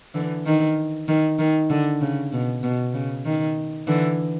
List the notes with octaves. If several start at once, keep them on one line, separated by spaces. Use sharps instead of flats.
D3 E3
D#3
D#3
D#3
D3
C#3
B2
B2
C#3
D#3
D3 E3